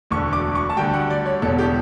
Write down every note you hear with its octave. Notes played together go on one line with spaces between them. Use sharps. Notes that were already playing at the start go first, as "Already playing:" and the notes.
E1 D2 D3 C#6
D6
C#6
A5
D2 D3 G3 G5
F#5
D5
C#5
E1 E2 B2 A4
G4